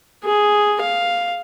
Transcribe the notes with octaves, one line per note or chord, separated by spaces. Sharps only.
G#4
F5